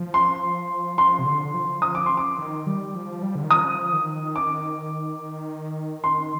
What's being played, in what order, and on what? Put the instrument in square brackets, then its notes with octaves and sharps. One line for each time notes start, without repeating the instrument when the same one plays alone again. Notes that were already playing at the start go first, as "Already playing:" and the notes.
Already playing: [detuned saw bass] F3
[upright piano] C6
[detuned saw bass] F3 [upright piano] C6
[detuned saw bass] C3
D3
F3
[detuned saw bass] F3 [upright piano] D#6
[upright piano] D6
C6
D6
[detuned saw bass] D#3
G3
F3
G3
D3
D#3
[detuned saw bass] F3 [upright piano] D#6
[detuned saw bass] D#3
[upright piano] D6
[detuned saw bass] D#3 [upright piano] C6